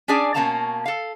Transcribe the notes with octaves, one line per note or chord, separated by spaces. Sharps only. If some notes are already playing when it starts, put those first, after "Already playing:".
C#4 D4 G#4 D5 G#5
B2 A#3 C#4 F5 A5 A#5
A4 F5